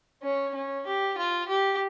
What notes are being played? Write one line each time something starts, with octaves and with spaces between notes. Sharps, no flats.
C#4
C#4
G4
F4
G4